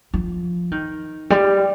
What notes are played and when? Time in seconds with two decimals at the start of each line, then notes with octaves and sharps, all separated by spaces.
0.14 F3
0.71 D#3
1.30 G3